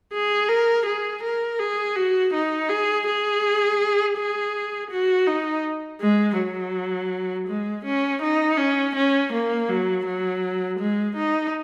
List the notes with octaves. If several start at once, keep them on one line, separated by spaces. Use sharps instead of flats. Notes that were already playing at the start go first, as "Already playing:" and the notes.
G#4
A#4
G#4
A#4
G#4
F#4
D#4
G#4
G#4
G#4
F#4
D#4
G#3
F#3
G#3
C#4
D#4
C#4
C#4
A#3
F#3
F#3
G#3
D#4